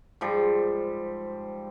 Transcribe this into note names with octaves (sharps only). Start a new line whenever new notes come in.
G#2 F3 G3